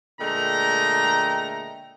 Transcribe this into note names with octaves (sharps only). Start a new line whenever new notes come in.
A#2 D3 G#3 A3 G5 A#5